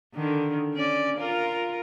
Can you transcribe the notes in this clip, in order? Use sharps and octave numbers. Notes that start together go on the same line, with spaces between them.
D3 D#3
C#4 D5
F4 A#4